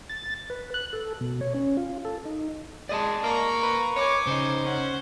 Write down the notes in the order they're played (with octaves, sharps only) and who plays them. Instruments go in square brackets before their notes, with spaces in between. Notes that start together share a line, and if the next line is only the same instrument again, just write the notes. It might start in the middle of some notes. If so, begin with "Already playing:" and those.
[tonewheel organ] A6
B4
F#6
A4
B2
C#5
C#4
F4
A4
D#4
[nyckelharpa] G#3 [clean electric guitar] D5 D#5 A5
[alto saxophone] A#3 [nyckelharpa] A#5 C#6
[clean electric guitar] B4
[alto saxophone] C#5 [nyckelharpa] G#5 D6
[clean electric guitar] C#3 D#4 [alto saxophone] C5
[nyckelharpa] C#4 F#5